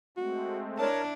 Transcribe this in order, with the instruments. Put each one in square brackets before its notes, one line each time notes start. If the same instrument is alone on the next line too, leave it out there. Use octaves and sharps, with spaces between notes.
[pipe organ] G#3 A3 C4 [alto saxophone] F#4
[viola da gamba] D4 E4 [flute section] A#4 C#5 [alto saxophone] A5